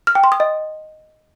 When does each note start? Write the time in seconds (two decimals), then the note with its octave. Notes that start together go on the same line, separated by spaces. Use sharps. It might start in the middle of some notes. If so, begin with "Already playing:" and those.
0.07 F6
0.15 G5
0.24 C6
0.32 D#6
0.40 D#5